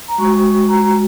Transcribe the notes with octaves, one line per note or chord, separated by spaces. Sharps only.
A#5
G#3 F#4 C#6
A#5